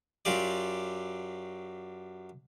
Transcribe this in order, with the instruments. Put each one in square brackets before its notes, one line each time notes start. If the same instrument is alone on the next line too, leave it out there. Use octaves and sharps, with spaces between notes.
[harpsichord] F#2 F#3 F4 G4 D5